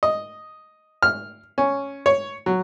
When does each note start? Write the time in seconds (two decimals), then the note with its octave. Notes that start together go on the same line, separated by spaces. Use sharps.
0.03 D#5
1.03 F6
1.58 C#4
2.06 C#5
2.46 F#3